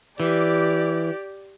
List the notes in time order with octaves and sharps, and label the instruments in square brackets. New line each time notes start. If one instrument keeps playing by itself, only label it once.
[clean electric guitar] E3 [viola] G4 D5